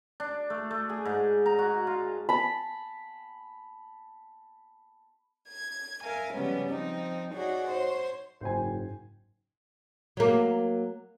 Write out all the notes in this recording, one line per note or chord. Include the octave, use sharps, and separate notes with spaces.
D4
A3
A3
G#4
G#2
A#5
F#4
F4
A5 B5
G#6
A#4 E5 F5 G#5
C#3 F3 G3 G#3 B3 C#4
F3 C4 D#4
D#4 F#4 G#4 C#5 D5
C5 C#5 C6
F#1 G#2 C5 G5 G#5
F#3 A#3